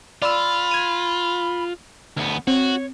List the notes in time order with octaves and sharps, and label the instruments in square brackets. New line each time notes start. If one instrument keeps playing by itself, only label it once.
[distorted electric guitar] F4 [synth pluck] D5 E6 [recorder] B5
[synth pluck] G#6 D#7
[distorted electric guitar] D2 B3
[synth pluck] C4 [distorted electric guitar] F#4 [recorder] C#5